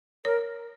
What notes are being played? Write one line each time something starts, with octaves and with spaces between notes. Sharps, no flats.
A#4 C#5